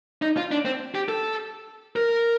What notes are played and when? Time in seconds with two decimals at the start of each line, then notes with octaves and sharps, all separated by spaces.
0.22 D#4
0.37 F4
0.52 D4
0.65 C4
0.95 G4
1.09 A4
1.96 A#4